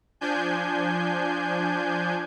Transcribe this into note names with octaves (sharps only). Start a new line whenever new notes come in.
F3 D4 G#5 G6